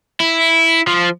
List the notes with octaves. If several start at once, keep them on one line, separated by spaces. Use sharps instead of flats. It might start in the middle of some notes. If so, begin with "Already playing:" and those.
E4
F3